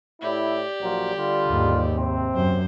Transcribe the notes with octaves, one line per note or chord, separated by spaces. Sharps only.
A2 E4 G4 D5
A#1 F#3 F4
D3 G3 F4
D#2 G#2
C3 C4
F#2 C5